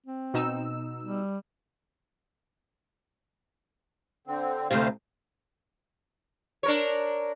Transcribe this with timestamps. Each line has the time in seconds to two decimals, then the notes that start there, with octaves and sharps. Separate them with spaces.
0.07 C4
0.34 B2 D#4 E6
1.03 G3
4.27 D3 C4
4.71 D2 C3 A3 C5 F5
6.63 D4 A#4 C#5